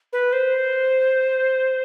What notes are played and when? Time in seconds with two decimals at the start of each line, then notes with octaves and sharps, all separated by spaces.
0.13 B4
0.32 C5